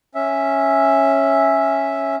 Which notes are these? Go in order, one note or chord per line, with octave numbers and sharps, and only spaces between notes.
C#4 E5